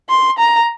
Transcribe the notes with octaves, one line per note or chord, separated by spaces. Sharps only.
C6
A#5